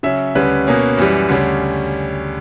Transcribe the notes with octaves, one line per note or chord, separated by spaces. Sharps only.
C#3 F#3 C#4 E5
D2 C#3 G3 C#4 B4
B2 A#3 C#4
F#2 E3 G3
D2 C#3 G3 C#4